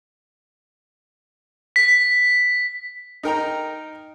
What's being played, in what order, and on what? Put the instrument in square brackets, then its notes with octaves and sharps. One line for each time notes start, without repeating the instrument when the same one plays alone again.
[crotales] B6
[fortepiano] D#4 A#4 G5 A#5